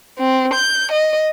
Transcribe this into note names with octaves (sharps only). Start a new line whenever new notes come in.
C4
G6
D#5